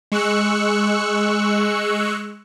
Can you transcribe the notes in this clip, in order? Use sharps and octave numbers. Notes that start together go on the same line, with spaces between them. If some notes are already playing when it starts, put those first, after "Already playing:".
G#3 C#6 E6 F#6 C#7